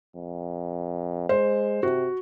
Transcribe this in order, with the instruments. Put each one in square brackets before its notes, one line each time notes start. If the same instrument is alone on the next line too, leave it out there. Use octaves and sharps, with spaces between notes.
[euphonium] F2
[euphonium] G#3 [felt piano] C5
[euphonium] C3 [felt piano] F#4